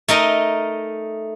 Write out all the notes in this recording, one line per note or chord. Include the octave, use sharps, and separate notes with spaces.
A3 D#4 A#4 D#5